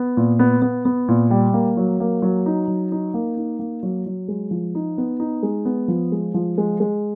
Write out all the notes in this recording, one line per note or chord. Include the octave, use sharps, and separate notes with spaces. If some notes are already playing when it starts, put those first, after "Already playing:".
Already playing: B3
A#2
B3
B3
B3
A#2
G3
A#3
F#3
A#3
F#3
D#4
F#3
D#4
A#3
D#4
A#3
F#3
F#3
G#3
F3
D#4
B3
D#4
G#3
B3
F3
G#3
F3
G#3
G#3